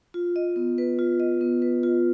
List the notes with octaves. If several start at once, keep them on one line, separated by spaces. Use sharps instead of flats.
F4
D#5
B3
B4
F4
D#5
B3
B4
F4